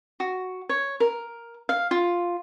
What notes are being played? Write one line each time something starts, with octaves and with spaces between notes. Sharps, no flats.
F#4
C#5
A#4
F5
F4